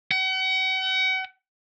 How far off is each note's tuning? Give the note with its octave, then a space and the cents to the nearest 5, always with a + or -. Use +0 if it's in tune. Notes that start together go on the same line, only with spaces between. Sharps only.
F#5 +40